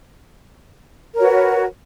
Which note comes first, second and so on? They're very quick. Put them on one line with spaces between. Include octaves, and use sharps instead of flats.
A#4 C#5 F#4 B4